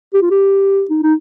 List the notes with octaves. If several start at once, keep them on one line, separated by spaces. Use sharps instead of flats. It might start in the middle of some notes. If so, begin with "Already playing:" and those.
G4
F4
G4
D#4
D#4